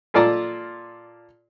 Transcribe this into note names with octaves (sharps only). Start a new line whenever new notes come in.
A#2 F4 A4 D5 A5 A#5